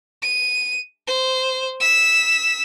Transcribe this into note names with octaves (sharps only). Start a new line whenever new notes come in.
D#7
C5
E6 B6